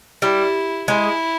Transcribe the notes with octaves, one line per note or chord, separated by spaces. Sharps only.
G3 E4
G#3 E4